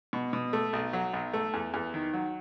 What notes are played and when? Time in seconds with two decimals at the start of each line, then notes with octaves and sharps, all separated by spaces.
0.13 B2
0.33 B2
0.53 A3
0.73 B1
0.93 F#3
1.13 B1
1.33 A3
1.54 E2
1.74 E2
1.94 D#3
2.13 F#3